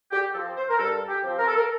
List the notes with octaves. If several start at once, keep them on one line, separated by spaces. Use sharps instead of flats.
G4
F3 C4 A4
C5
A#4
G2 A4
G4
F3 C4
A#4
A4
A#4